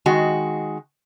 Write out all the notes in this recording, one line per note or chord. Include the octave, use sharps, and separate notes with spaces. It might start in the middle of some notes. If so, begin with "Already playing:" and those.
D#3 G#3 F#4